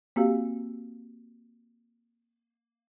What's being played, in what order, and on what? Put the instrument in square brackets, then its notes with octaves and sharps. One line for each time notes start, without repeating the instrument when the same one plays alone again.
[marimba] A#3 C4 F#4 G4 F5